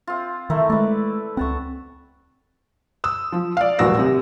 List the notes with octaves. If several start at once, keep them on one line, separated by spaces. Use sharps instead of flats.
C4 F4
D#3 A3 E4 A#4
G#3 A3 B4 D5
C#2 C4 F#5 A5 C#6
D#6 E6
F3
D5 F5
D#1 A1 F#4 E6 A#6
C3